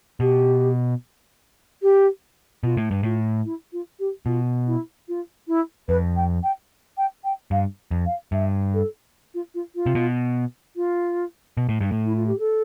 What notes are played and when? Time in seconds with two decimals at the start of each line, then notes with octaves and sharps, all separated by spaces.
0.20 B2 G4
1.82 G4
2.63 B2 F4
2.77 A2
2.91 G2
3.03 A2 F4
3.45 E4
3.72 F4
3.99 G4
4.26 B2 F4
4.67 E4
5.08 F4
5.48 E4
5.88 F2 B4
6.16 G5
6.43 G5
6.97 G5
7.24 G5
7.51 G2 F5
7.91 F2
8.06 F5
8.32 G2 E5
8.74 A4
9.34 F4
9.54 F4
9.75 F4
9.86 C3
9.95 B2
10.76 F4
11.57 B2
11.69 A2
11.81 G2
11.92 A2
12.05 E4
12.16 F4
12.27 G4
12.39 A4